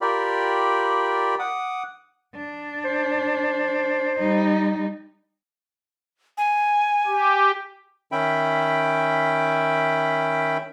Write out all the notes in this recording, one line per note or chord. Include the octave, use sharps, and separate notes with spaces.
F4 G4 A#4 D5 G5 B5
F#5 D6 D#6
D4
C5
G3 D#4
G#5
G4
D#3 C#4 E5 G5 B5